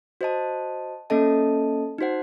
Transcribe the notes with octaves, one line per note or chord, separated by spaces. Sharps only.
F#4 C5 D#5 A5
A#3 C#4 A4 D#5 A5
D#4 F#4 C5 F#5